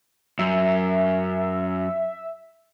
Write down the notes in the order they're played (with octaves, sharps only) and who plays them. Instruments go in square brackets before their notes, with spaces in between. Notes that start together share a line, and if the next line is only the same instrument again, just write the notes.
[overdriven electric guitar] F#2 [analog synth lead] E5